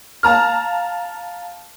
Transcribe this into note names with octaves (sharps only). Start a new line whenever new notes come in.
F5 A5 A#5 F6